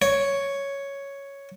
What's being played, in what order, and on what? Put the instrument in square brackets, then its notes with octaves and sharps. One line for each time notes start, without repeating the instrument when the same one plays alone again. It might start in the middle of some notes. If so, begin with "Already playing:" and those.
[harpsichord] C#5